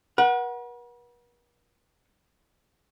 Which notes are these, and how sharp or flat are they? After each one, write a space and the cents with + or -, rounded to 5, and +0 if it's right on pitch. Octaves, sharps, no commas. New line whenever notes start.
B4 -45 F#5 +0